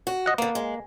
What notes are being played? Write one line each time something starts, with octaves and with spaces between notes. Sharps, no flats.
F#4
D#5 F#5
D3 A#3 B3
G#3